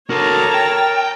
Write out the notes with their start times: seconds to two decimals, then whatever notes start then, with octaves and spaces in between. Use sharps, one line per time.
0.10 F#4 A4 A#4 C#5 A5 A#5
0.54 G5